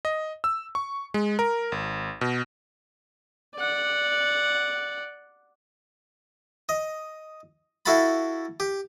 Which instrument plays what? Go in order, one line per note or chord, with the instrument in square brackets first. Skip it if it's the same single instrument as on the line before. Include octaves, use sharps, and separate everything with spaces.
[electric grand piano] D#5
E6
C#6
G#3
A#4
G#1
B2
[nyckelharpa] D5 F#5
[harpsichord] D#5
E4 F#4 A4 F5 A5 B5
G4